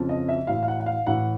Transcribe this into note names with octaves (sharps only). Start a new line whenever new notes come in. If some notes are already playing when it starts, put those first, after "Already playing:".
Already playing: F2 C#3 F3
D#5
E5
A2 E3 F5
F5
F#5
F#5
F5
A2 E3 F#5